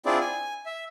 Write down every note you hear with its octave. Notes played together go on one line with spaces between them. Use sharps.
C4 D4 E4 F4 G#4 D5
G#5
E5